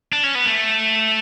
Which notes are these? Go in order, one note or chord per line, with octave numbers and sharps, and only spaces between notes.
D4
C#4
B3
A3